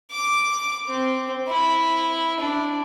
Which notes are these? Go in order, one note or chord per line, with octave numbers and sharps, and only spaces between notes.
D6
C4
E4
D4